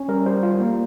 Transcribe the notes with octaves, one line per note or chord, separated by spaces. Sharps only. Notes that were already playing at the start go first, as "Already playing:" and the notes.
Already playing: C#4
G3 A#4
G3 C5
F4
A#3